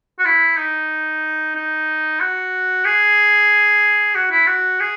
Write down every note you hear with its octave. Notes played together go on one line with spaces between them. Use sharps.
F#4
E4
D#4
D#4
F#4
G#4
F#4
E4
F#4
G#4